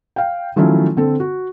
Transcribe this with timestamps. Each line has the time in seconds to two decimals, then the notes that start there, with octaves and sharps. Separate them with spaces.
0.16 F5 G5
0.56 D#3 F3 F#3 A3 C#4 E4
0.97 D3 C4 A4
1.20 F#4